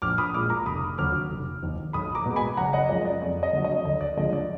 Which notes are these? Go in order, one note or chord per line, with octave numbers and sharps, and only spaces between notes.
A#1 D6 F6
B5 D#6
A#2 G#3 D6 F6
A#5 D6
F1 B5 D#6
D#2 D3 F#3 D6 F6
F1
D#2 D#3
B1 B5 D#6
A#5 D6
B2 G#3
G#5 B5
F#1 F#5 A#5
D#5 F#5
F#2 F3 G#3 D#5
D5
F2 D5
D#5
D3 F#3
D#5
D2 D#5
D5
D3 F3 G#3 D#5
D5